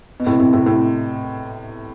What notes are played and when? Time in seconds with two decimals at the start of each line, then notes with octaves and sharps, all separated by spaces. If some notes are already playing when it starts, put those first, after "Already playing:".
0.20 B2
0.27 A2 C3
0.39 A2 C3
0.53 A2 C3
0.66 A2 C3